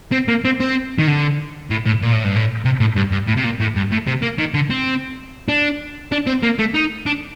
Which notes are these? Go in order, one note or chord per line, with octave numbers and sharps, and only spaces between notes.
C4
A#3
C4
C4
D#3
D3
A2
A2
A#2
A2
G2
A2
C3
A2
G2
G2
A2
C3
A#2
A2
G2
A2
C3
A#3
D#3
D3
C4
D4
D4
C4
A#3
A3
D#4
D4